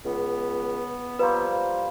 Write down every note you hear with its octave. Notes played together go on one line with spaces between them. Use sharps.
C#2 B3
F3 G3 A#3 B4 C5